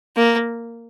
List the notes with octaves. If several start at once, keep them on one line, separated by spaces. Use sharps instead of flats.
A#3